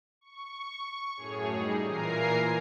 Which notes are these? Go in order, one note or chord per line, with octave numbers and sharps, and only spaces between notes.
C#6
F#2 A2 G#4 C#5
G3 D#4 G#4
A#2 E3 A#4 G#5 A#5 C7